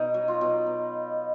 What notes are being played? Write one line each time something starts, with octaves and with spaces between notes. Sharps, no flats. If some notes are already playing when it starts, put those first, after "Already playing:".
Already playing: B2 D#4
F#3
F4
B2
B3